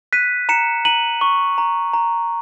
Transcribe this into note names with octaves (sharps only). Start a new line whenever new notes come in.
F#6 B6 D#7
A#5 C#7 E7
A#5 D#7 F#7
C#6
A#5
A#5